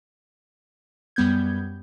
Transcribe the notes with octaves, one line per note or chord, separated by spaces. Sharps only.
F#2 G3 B3 G6 G#6